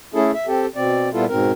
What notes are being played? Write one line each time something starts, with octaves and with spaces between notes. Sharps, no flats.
A3 C#4 E4 G#4 A4
E5
C4 G4 A4
B2 C4 D5
A#2 G3 B3 E4 F4 A4
G#2 B2 C4 A#4